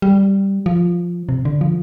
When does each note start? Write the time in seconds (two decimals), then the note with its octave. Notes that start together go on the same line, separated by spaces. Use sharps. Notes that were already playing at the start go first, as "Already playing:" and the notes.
0.02 G3
0.66 F3
1.29 C3
1.45 D3
1.61 F3